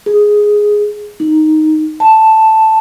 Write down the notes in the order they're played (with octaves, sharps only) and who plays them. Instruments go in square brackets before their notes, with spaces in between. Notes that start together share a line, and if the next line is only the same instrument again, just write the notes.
[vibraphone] G#4
D#4
A5